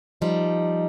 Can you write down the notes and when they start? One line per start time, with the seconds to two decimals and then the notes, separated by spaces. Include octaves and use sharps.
0.22 F3 G3 D#4